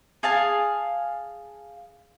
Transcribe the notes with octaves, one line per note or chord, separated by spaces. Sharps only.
G#4 F5 A5